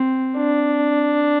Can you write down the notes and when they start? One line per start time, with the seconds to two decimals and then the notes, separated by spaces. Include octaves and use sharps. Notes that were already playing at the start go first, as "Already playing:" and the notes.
Already playing: C4
0.37 D4